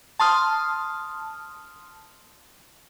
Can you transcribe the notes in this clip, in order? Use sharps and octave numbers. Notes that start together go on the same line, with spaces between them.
A5 C6 D#6 F6